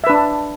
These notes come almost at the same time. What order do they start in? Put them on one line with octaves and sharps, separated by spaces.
E5 B4 D4